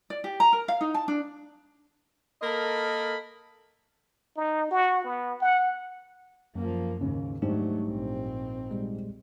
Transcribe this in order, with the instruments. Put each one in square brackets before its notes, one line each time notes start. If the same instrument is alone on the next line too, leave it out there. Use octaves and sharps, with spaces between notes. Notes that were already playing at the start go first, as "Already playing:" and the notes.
[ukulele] D5
G4
A#5
A#4
F5
D#4
A5
D4
[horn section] A#3 A4 A#4 D#5 B5
[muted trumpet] D#4
F#4
B3
F#5
[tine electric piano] F#2 [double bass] F3 A#3
[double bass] D#2 G#2 [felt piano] C#3
[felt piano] G#2 C5 [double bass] F#3 A3 [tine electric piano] G3 D4 G4
[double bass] A#1 C4
[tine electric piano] A#2 G3 G#3